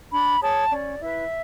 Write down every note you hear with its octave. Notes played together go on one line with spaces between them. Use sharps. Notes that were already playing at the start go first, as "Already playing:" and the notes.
D4 B5
G#4 C#5 A5
C#4 D5
E4 B4 E5